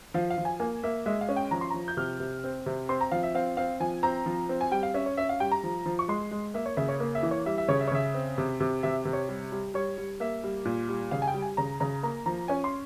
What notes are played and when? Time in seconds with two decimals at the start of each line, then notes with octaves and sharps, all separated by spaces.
0.14 F3 F5
0.30 F5
0.38 F3
0.45 G#5
0.60 A#3 G#5
0.83 A#3 E5
1.06 G#3 E5
1.21 F5
1.29 C#4
1.36 G5
1.51 F3 A#5
1.61 C6
1.70 F3 A#5
1.88 G6
1.97 C3 F6
2.20 C3
2.44 C4
2.66 C3
2.89 C4 C6
3.01 A#5
3.12 F3 F5
3.23 E5
3.34 C4 F5
3.57 C4 F5
3.80 F3 G#5
4.03 C4 A#5
4.26 F3
4.49 C4
4.61 G#5
4.71 G3 G5
4.83 F5
4.94 C#4 E5
5.06 C#5
5.17 C#4 E5
5.29 F5
5.40 G3 G5
5.51 A#5
5.63 F3
5.86 F3
5.99 C#6
6.08 G#3 C6
6.31 G#3
6.54 A#3 E5
6.66 C#5
6.77 C#3 E5
6.89 C#5
7.00 A#3
7.15 E5
7.23 E3
7.31 C#5
7.46 G3 E5
7.58 E5
7.68 C#3 C#5
7.81 E5
7.87 C#5
7.92 C#3 E5
8.14 C4
8.38 C3
8.60 C3
8.83 C3 E5
9.05 C3
9.13 C#5
9.29 G3
9.52 G3
9.74 G3 C#5
9.98 G3
10.20 A#3 E5
10.44 G3
10.65 A#2
10.89 G3
11.11 C#3 F5
11.22 G#5
11.28 G5
11.34 G3
11.42 G#5
11.57 C#3 A#5
11.80 C#3 A#5
12.03 A#3 A#5
12.26 F3 A#5
12.48 C#4 G#5
12.64 C6